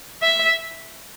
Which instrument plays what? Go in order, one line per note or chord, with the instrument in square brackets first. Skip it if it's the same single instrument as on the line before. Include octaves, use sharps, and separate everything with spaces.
[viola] E5